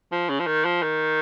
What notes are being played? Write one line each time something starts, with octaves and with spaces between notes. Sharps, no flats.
F3
C#3
F3
D#3
F3
D#3